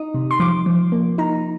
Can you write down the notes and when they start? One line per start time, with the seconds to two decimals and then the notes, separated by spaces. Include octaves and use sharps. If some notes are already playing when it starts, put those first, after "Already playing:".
Already playing: D#4 D#6
0.14 C3
0.31 C6
0.40 F3 D6
0.66 F3
0.92 A#3
1.18 D#4 A#5